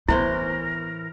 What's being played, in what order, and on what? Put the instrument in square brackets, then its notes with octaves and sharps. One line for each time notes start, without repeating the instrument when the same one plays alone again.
[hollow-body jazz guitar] A2 E3 C5 [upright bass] B3 [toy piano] E4 [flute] A#4